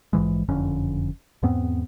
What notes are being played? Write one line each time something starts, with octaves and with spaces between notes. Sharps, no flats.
A#1 G#2 E3 G#3
F#1 F2 D3 C#4
E2 G#2 B3 C4